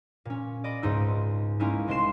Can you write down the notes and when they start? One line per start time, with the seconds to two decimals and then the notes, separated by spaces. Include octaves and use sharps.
0.25 A#2 C#4
0.64 D5 D#5 B5
0.82 C#2 G#2 D#4 E6
1.60 G#3 A#3 C#4 D#4 E4
1.87 C2 G#3 C6 C7 E7